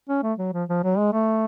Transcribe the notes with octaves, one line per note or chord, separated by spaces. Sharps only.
C#4
A3
F#3
F3
F3
F#3
G#3
A3